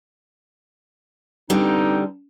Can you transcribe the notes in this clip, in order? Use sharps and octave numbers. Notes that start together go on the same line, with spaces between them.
D3 G3 B3 C4 D#4